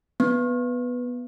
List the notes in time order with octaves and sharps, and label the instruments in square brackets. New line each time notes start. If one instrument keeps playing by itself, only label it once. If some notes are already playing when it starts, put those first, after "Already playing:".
[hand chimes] B3